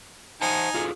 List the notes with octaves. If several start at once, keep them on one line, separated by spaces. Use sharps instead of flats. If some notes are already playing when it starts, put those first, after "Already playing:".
D#4 C5 F#5 G#5 A5
F4 G#4 A4